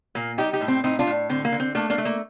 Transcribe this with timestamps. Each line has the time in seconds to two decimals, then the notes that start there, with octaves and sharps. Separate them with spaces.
0.15 A#2 A#3
0.38 G3 D#4 G4
0.53 D#4 G4
0.61 A2
0.68 C4
0.84 A2 C4 D#4
0.99 D4 F4
1.07 A2
1.29 D3 C4
1.45 A#3
1.52 D3
1.60 C4
1.75 A3 A#3 D4
1.90 A#3 D4
1.98 A3
2.05 A#3